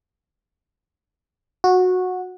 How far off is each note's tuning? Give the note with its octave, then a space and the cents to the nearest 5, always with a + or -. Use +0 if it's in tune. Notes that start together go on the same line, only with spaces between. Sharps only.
F#4 -15